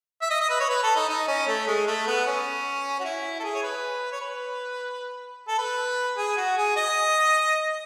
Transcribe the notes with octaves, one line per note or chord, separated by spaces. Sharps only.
E5
D#5
D#5
B4
C#5
B4
A4
D#4
D#4
C#4
A3
G#3
A3
B3
C#4
F#4
E4
A4
G#4
C#5
B4
C#5
B4
A4
B4
G#4
F#4
G#4
D#5